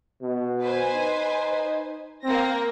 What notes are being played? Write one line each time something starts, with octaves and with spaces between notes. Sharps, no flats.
B2
B4 C5 G#5
D#4
A#3 C4 A#6